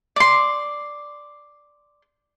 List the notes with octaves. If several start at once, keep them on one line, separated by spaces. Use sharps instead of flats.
D5 C6